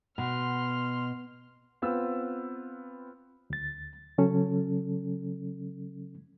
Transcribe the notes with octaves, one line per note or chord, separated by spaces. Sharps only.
B2 C6 F6
B3 C4 F4 E6
D2 A6
C#3 F#3 C#4 A4